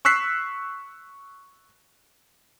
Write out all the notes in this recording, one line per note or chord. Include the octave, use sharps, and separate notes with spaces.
C#6 E6 F#6 B6 C7